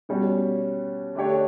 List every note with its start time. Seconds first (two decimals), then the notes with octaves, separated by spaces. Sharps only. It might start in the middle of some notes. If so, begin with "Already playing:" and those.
0.09 B2 G3 C#4 F#4
1.15 D3 A3 D4 G4 C#5